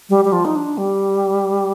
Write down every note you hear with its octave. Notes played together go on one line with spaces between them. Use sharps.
G3
G3
F3
D#4
D4
G3